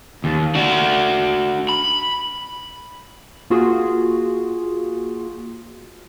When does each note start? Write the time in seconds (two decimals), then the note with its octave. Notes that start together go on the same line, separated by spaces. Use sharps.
0.24 D#2
0.55 D4 F#4
1.69 B5
3.50 A#3 F4 F#4 G#4